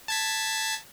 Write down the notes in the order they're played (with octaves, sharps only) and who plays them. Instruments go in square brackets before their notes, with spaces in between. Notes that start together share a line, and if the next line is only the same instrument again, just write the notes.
[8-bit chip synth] A5 G#6 B6